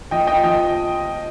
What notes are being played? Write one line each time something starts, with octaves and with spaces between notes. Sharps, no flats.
F3 D#5 G5
F4 D#5 G5
F3 D#5 G5